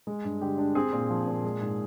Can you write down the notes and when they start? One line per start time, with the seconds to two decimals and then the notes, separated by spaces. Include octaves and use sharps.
0.07 G#3
0.24 G2
0.41 D3 G4
0.58 D4
0.75 C4 G#4
0.93 A#2
1.10 F3
1.28 A#2
1.44 G#3
1.61 G#2